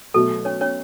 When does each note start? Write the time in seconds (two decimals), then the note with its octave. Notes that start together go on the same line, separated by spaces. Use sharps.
0.14 B2 F#3 A3 A4
0.45 C#4 C#5
0.61 C#4 C#5